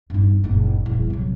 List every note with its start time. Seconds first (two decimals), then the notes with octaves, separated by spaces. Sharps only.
0.10 G2 D#4
0.44 F#1 A#2
0.86 D#1 E2
1.10 C3 F#3